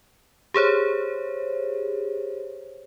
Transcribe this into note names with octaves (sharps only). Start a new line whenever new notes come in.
G4 G#4 C5 C#5